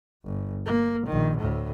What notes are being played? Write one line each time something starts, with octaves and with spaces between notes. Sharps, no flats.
G1
A#3
A#1 D#3
D2 A2